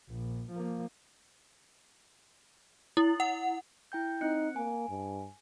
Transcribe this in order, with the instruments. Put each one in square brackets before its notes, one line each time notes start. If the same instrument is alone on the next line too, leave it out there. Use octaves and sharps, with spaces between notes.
[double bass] A#1
F3 A#3
[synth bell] E4
F#5
[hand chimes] E4 G5 G6
[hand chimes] C4 F#6 C#7 [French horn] D#4
[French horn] A#3 [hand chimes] G#5
[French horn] G2